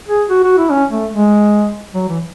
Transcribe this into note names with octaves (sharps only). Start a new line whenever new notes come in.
G#4
F#4
F#4
E4
C#4
A3
G#3
F#3
E3